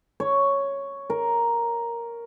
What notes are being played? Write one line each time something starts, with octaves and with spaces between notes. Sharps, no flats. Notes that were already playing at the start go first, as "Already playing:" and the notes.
C#5
A#4